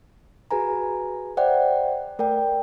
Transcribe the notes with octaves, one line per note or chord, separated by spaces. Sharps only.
F#4 G#4 B4 G#5 A#5
C5 D5 E5 F#5 G5
A3 A#4 D5 G5